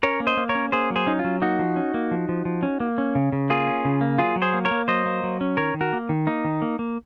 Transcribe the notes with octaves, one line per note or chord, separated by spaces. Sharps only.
C#4 A#4 C#5
A#3
C5 D#5
A#3
A#4 C#5
C#4
A#3 G#4 C5
F#3
G#4 C5
C#4 D#4
F4
F#3
A#3 D#4 F#4
F3
C#4
A#3
F3
F3
F3
C#4
A#3
C#4
C#3
C#3
A#3 F4 G#4
C#4
C#3
A#3
F#3 F4 G#4
F#3
G#4 C5
A#3
A#4 C#5
A#3
F#3 C5 D#5
A#3
F#3
C#4
D#3 A#4 C#5
D#3
F#4 A#4
A#3
D#3
A#3 D#4
D#3
A#3
A#3